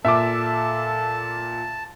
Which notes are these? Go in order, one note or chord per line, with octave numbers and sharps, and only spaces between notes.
A#2 A4 E5 A5 D6